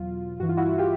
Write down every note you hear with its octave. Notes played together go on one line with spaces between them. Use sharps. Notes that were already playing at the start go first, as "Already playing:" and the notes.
Already playing: E2 B2 F#3 F4
G2 E3 F#4
F4
E4 F#4
F4 G4